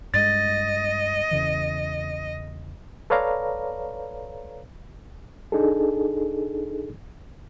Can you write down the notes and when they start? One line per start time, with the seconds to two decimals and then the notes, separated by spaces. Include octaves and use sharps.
0.14 G2 G#3 D#5 A6
1.31 E2 C#3 E3
3.10 A4 B4 C#5 D5 F5 A#5
5.52 D4 D#4 G#4 A4